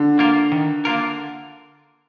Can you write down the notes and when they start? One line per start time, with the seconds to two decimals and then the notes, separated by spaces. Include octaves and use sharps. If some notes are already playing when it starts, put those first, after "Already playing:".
Already playing: D3
0.19 A#3 F4 A#4
0.52 D#3
0.85 A#3 F4 A#4